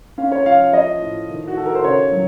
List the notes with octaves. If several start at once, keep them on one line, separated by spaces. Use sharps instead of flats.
C#4 F5
C#5
F3 F5
F5
F3 D#5
A2
D#3
F#4
D#3 A4
A#4
C5
C#3 C#5
F#3